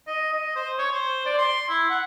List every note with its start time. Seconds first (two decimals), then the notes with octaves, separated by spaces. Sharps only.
0.07 D#5
0.33 D#5
0.56 C5
0.78 C#5
0.92 C5
1.26 D5
1.38 C6
1.69 E4
1.90 F#5